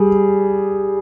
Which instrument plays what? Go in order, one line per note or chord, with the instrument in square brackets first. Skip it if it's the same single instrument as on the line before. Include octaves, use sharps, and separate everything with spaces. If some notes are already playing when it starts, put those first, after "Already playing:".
Already playing: [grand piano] G3 G#4